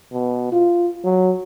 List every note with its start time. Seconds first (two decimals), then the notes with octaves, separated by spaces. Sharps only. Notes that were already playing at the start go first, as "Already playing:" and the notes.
0.13 B2
0.52 F4
1.04 F#3